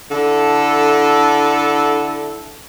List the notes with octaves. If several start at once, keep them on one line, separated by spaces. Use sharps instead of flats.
D3 E4 A4